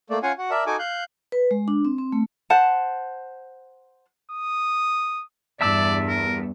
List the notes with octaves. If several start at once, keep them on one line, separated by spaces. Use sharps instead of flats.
A3 A#3 D5
C#4 F4 F5 F#5 G#5
F#4 F#5
A#4 D5 E5 A5
D#4 F#4 A4 G#5 D6
F5 F#6 G6
B4
G#3
D4
C4
C4
A3
C5 F#5 A5
D#6
E2 G2 D5 E5 A5 E6
A#4